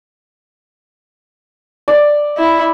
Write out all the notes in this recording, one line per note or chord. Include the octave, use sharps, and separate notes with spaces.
D5
E4